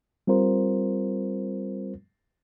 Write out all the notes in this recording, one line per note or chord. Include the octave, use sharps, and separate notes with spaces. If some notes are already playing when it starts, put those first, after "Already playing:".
G3 C4 F4 A#4 C5